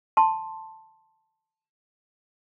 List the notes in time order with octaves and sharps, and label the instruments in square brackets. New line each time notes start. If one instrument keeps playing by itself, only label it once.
[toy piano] A5 C6